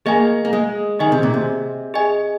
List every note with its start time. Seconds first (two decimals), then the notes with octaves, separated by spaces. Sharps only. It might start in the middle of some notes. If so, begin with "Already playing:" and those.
0.06 A#3 G#4 D#5 G#5
0.45 A#3
0.53 G#3
0.99 D#3 G#4 D#5 G#5
1.12 C3
1.23 A#2
1.34 C3
1.94 G#4 D#5 G#5